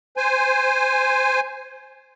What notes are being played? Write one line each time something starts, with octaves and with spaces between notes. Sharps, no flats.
C5 G#5